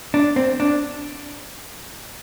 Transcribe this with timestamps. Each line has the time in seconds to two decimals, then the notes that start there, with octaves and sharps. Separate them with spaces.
0.14 D4
0.36 C4
0.60 D4